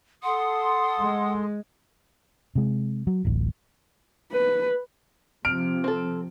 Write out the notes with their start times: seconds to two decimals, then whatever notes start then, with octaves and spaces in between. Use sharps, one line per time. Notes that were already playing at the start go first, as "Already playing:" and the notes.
0.23 A4 F#5 C6 D#6
1.00 G#3
2.55 C3 G#3
3.07 F#3
3.25 D1 A1
4.32 B4
5.45 C3 F3 F6 D7
5.84 C4 A4